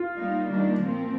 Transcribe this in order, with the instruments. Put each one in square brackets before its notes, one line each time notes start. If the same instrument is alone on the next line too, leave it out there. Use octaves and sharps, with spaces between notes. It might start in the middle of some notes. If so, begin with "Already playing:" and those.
Already playing: [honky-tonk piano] F4
[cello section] G3 A#3 D#4
D#3 G3 A#3 D4
A#2 F3 C4